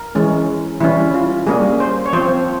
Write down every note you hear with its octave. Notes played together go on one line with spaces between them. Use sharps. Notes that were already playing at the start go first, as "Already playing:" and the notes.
Already playing: A#4
E3 G#3 C#4
E3 G3 C#4 E4
F4
G3 A#3 C#4 G#4
C5
C#5
F3 C4 C5